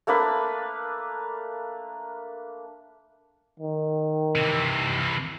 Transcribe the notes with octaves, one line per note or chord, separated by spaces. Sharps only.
A3 A#3 D4 B4
D#3
C3 E3